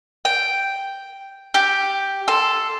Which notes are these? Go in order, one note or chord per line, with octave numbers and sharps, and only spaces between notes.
G5
G4
A4 C6